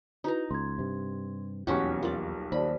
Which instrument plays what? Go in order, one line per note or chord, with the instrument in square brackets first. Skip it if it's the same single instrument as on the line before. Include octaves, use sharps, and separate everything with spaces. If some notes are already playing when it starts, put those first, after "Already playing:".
[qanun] D#4 A#5 [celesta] E4 F#4 B4
[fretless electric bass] C#2 [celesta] C6 G#6
[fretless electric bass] G2 C3
[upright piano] D#1 B1 C#6 [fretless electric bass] E2 [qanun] C#4 F#4 G4
[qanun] F4 D5 [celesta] A#4
[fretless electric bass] D#2 [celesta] C5 D5 A5 [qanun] B5